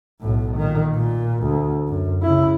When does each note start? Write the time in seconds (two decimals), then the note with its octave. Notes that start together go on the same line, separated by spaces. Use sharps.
0.20 B1 A2
0.57 A#2 D#3
0.95 A#2
1.43 D2
1.88 F#2
2.22 C#3 E4